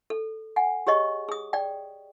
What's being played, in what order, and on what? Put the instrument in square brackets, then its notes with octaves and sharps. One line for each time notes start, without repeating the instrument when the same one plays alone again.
[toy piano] A4
F#5 G#5
G4 G#4 C#5 D#5 C#6
G#4 D#6
D5 G5